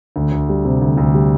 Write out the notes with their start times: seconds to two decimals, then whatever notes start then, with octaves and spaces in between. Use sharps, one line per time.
0.16 D2
0.32 D2
0.49 G3
0.65 C3
0.82 D2
0.97 D2
1.14 G3